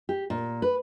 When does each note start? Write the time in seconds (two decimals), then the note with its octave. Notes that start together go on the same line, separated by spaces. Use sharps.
0.09 G4
0.30 A#2
0.62 B4